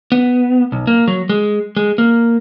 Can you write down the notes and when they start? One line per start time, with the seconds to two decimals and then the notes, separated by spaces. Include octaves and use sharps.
0.12 B3
0.72 B1
0.87 A#3
1.08 F#3
1.29 G#3
1.77 G#3
1.98 A#3